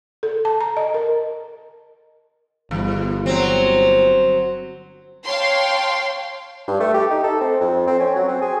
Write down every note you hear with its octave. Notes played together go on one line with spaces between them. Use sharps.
A4
A5
A#5
D#5
A#4
G1 E2
F#3 C4
C#5 F5 G5 A5 C6
G2
A3
G4
D#4
A4
C4
F2
C4
C#4
F#3
C4
G#4